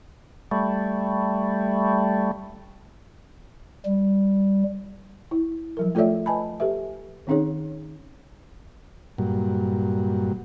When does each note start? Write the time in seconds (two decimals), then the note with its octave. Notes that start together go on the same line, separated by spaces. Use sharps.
0.51 G3 A3
3.85 G3
5.31 E4
5.77 F3 F#3 A#4
5.95 A3 F4 A4 C#5 D5 E5
6.26 B4 D#5 G#5 A5 B5
6.60 G4 A4 B4 E5
7.27 D#3 C4 C#4 D#4 G#4 C#5
9.18 G2 A#2 F#3